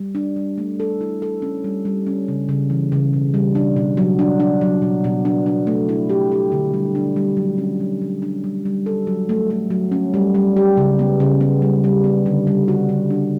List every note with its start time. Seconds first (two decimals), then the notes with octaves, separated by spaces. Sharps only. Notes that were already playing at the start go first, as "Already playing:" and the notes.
Already playing: G3
0.15 D4
0.36 G3
0.58 A3
0.80 A4
1.01 E4
1.22 A4
1.42 C#4
1.64 G3
1.85 G3
2.07 C#4
2.28 C#3
2.49 C#3
2.70 E3
2.92 C#3
3.13 B2
3.34 G3
3.55 D4
3.76 B2
3.97 F#3
4.19 D4
4.40 D4
4.61 F#3
4.82 B2
5.04 B2
5.25 D4
5.46 D4
5.67 A3
5.89 E4
6.09 G4
6.32 G4
6.52 D3
6.74 G3
6.95 D4
7.16 G3
7.37 F#3
7.58 C#4
7.80 F#3
8.02 F#3
8.22 D4
8.44 G3
8.65 G3
8.86 A4
9.07 F#3
9.29 A3
9.50 A3
9.70 F#3
9.92 C#4
10.14 G3
10.35 G3
10.56 G4
10.77 C#3
10.99 B3
11.20 C#3
11.41 B3
11.62 G3
11.84 G3
12.04 B3
12.26 D3
12.47 G3
12.68 F#4
12.89 D3
13.10 D4